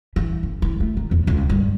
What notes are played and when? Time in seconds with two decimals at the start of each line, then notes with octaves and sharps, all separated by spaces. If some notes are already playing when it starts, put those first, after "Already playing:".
0.16 E3
0.43 F#1
0.62 E3
0.80 A3
0.97 D#3
1.11 E2
1.27 C#2
1.50 G2